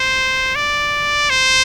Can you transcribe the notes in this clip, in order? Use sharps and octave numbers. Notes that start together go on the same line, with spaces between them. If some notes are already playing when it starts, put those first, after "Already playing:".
Already playing: C5
D5
C5